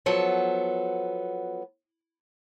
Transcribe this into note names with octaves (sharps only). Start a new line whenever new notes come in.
F3 F#3 B3 A4